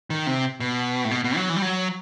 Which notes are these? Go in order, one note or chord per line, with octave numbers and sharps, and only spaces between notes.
D#3
C3
B2
A2
B2
B2
F#3
E3
G3
F#3